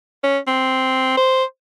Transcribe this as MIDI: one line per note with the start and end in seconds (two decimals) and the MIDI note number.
0.24 0.38 61
0.47 1.17 60
1.18 1.44 72